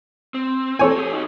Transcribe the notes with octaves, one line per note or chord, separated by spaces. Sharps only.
C4
A4 C#5 G#5
G4 G#4
D#4 F#4